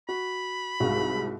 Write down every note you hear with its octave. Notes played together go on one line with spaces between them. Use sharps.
F#4 B5
C2 G#2 F#4 F5